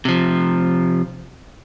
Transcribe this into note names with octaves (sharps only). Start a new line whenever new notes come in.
C3 F3